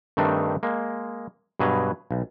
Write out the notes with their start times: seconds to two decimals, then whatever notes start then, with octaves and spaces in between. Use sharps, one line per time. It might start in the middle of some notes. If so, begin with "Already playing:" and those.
0.17 G2 D#3 A3 C4 D4 D#4
0.63 G#3 A#3
1.60 G2 B2 F#3 G#4 B4 A#5
2.11 B1